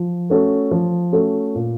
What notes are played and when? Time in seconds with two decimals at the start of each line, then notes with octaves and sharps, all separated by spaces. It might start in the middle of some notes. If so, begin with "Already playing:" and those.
Already playing: F3
0.30 A3 C#4 F#4 A4
0.71 F3
1.13 A3 C#4 F#4 A4
1.55 A#2